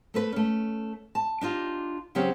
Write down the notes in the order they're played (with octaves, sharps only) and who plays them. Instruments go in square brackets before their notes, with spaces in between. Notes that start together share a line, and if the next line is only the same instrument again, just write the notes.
[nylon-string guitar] A3 A4 B4
A3 C#4
A5
D4 D#4 F4 G4
C#3 F#3 C4 C#4 G4